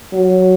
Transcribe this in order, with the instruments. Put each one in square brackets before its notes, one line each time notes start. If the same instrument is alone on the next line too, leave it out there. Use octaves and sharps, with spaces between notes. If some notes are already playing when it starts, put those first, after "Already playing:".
[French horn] F#3